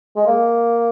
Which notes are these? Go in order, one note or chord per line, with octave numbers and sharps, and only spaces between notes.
G#3
A#3